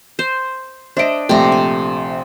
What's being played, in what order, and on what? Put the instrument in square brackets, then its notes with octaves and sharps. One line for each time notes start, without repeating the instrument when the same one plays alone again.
[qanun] C5
[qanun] D4 D#5 [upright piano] C5 E5 D7
[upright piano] A#1 A3 [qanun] C3 A#5
[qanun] G#5